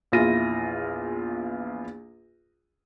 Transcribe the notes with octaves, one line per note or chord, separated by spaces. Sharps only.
A#1 E2 E4 F4 A#6 D#7